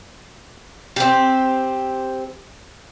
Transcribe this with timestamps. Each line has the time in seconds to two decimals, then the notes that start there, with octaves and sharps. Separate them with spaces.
0.96 C4 G4